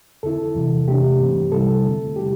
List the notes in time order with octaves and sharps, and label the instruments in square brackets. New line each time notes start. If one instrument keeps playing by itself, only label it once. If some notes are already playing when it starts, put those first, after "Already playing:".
[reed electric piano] E2 D3 C4 E4 A4
E2 C3 E3
C3 A3 D4 G4
G2 E3 C4
C3 G3 C4 E4 A4
E2 D3 A3 E4
C3 G3 E4 G4